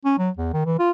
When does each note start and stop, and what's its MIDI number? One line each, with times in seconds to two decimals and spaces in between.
0.05 0.14 61
0.18 0.30 54
0.37 0.50 40
0.54 0.64 51
0.66 0.77 52
0.79 0.91 65